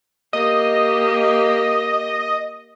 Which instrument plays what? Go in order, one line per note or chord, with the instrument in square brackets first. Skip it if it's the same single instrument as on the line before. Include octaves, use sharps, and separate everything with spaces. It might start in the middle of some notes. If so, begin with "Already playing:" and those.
[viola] A#3 G4 [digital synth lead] D#5